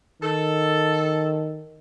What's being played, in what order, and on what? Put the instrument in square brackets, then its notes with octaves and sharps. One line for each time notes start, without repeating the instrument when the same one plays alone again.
[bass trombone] D#3 [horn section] A4